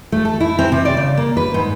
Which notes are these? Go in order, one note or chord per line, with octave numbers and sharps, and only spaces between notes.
A3
A4
E4
C4
C3
D5
C#3
A#3
B4
G#2